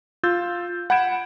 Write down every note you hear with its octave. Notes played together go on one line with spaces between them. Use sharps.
F4 E6 G6 A6
F#5 B5 G6 G#6 D7 E7